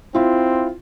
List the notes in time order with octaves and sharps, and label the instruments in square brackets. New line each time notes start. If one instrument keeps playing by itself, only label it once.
[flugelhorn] C4 [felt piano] E4 F4